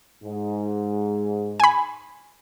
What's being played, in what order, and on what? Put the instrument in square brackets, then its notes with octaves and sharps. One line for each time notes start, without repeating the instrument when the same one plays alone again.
[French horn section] G#2
[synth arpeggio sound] G#5 B5